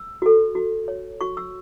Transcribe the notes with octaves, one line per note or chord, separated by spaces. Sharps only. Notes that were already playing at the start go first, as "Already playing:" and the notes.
Already playing: E6
F#4 A4
F#4
C#5
F#4 C#6
E6